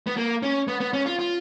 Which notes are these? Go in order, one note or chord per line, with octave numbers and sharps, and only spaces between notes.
B3
A#3
C#4
B3
B3
C#4
F4
F4